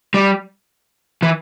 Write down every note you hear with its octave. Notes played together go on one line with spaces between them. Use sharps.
G3
E3